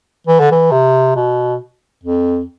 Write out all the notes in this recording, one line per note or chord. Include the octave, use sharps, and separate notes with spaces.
E3
D3
E3
C3
B2
F2